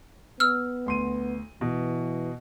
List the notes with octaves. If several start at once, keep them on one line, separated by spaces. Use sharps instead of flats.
B3 E6 F6
D2 C6 D#7
B2 E3